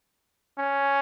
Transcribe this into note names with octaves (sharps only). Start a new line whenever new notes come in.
C#4